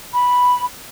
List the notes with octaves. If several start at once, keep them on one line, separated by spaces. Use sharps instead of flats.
B5